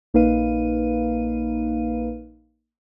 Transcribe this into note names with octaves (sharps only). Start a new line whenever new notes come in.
A#1 A#3 D#4 B4 F5 D#7